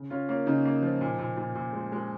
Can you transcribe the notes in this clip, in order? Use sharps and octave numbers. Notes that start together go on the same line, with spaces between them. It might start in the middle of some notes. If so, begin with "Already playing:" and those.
Already playing: C#3
C#3 C#4 F4
A#3 C#4 F4
C#3 D#4
A#3
F3
A#2
A#2
A#2
A#2
G#3
G#3